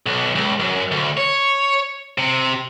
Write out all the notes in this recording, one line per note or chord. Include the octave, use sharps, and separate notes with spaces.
B1
C#2
F#2
D2
C#5
C3